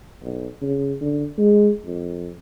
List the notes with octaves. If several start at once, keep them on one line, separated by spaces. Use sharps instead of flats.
B1
C#3
D3
G#3
F2